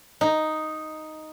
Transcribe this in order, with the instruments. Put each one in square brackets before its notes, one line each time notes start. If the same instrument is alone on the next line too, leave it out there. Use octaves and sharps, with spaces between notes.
[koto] D#4